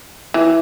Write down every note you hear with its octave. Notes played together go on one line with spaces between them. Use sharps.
E3